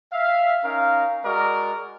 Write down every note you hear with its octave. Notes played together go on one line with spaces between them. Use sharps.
E5 F5
C#4 D#4 A#4 F5
G#3 F#4 A#4 D5 D#5